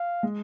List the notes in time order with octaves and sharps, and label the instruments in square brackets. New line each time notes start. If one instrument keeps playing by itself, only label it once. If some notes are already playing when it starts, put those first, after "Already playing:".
Already playing: [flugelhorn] F5
[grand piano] G#3